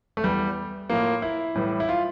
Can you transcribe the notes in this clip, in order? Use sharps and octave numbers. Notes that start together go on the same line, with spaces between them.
A3
E2 E3 G3
A2 F3 A#3
E4
A2 E3 G3
E4
F4